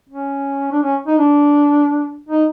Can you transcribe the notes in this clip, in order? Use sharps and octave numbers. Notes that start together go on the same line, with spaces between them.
C#4
D4
C#4
D#4
D4
D#4